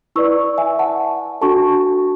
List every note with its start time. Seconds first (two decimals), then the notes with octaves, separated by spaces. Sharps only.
0.16 E4 B4 D5 C#6 E6
0.58 E5 G#5
0.79 F#5 A5
1.41 D4 F#4 A4 A5 C#6